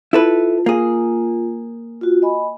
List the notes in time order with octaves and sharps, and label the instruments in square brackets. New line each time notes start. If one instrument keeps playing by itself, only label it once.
[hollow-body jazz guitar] E4 A4 B4 [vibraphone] F4
[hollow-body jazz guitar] A#3 G#4
[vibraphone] F4 F#4
D#5 G#5 B5